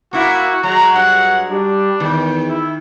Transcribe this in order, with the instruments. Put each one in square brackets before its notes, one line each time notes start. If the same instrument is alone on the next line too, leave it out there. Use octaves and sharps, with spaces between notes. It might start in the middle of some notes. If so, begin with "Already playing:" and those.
[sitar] A#3 E4 [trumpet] F#4
[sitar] F#3 G#3 [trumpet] A#5
[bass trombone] G2 [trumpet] F#5
[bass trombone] G3 [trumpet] D4
[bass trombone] E2 [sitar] D#3
[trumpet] E4